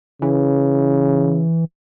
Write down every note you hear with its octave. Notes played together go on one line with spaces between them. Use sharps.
C#3 E3